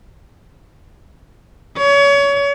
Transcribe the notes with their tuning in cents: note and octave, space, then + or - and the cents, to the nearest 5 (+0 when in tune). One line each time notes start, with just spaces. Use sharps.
C#5 +30